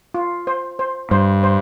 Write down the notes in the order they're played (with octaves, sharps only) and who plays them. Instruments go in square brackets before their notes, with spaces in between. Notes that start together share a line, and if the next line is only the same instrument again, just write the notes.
[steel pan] F4
C5
C5
[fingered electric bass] G2 [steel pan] C5
[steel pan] C5